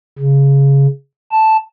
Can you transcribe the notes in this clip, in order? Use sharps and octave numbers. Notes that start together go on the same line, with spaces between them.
C#3
A5